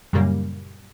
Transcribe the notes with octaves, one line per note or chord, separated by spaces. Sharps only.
F#2 A#2 C#3 G3 A#3